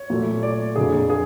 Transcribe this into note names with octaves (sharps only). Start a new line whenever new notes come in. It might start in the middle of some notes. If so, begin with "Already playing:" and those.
Already playing: C#5
A#2 F#3 A3
D5
F2 D3 F#3 A#3 G#4
G#4